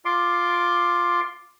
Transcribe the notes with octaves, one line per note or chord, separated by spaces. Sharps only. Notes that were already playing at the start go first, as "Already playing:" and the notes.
F4 C6 D6